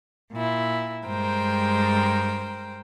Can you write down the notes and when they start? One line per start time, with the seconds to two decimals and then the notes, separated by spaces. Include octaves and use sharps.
0.33 A#2 E4
1.06 G2 G#3 A#4 C5 G5